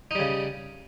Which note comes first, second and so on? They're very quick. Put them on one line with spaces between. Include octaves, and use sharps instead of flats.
D#4 G3 C#3